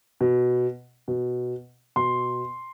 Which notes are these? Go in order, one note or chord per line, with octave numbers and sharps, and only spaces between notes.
B2
B2
B2 C6